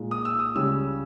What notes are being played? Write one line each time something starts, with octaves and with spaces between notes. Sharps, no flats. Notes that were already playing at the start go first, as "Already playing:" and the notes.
Already playing: A#2 G#3 D#4
D#6
E6
D#6
C#2 C#3 G3 C#4 E6